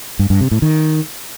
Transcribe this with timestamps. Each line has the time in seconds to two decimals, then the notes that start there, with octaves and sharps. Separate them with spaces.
0.19 G2
0.30 G2
0.41 C3
0.51 A2
0.62 D#3